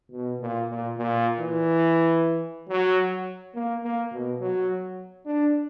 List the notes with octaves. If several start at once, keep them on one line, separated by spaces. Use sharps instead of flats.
B2
A#2
A#2
A#2
E3
F#3
A#3
A#3
B2
F#3
D4